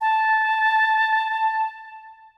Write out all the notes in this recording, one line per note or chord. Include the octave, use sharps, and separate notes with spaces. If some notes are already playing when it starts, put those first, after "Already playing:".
A5